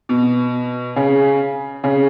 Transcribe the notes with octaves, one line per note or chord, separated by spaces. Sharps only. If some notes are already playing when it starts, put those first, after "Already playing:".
B2
C#3
C#3